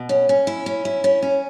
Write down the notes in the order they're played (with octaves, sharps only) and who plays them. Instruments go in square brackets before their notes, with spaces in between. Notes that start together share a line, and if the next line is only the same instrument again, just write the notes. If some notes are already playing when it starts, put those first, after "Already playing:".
Already playing: [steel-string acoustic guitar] B2
C#4
C#4
E4
C#4
E4
C#4
C#4